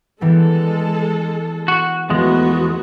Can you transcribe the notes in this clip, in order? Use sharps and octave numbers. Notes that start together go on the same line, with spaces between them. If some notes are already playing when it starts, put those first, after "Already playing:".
E3 G3 G#3 B3 A4
F#4
E2 F3 G#3 A3 B3 F#4